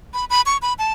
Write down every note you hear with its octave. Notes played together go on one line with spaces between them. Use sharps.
B5
B5
C#6
B5
A5